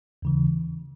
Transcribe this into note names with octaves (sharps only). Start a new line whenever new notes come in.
D#2 C#3 E3